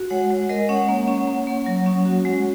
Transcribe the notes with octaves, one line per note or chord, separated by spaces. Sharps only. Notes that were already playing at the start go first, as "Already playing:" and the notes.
Already playing: F#4
G#3 C#5 F#5
G#3
G#3 A#4 D#5
C#4 C#5 F#5
A#3
C#4
A#3
A#3
F#3
C#4
F#4
G#3